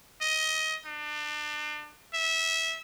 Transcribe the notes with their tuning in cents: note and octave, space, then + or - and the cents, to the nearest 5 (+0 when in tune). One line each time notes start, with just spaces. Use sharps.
D#5 +20
D4 +35
E5 -20